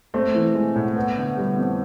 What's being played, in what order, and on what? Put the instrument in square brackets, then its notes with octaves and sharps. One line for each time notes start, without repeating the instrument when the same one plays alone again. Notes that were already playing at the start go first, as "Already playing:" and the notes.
[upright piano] A3 [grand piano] C4
[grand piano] E3
G#3
A2
B3
D3
G3
F2